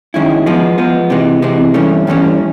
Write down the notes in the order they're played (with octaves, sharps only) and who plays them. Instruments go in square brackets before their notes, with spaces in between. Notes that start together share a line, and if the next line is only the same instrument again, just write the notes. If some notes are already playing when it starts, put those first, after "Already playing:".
[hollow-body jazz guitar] F#2 D#3 G#3 C#4 E4
F3 G#3 B3
F3 G#3 B3
C3 E3 G#3
C3 E3 G#3
G2 E3 A3 C#4
G2 E3 A3 C#4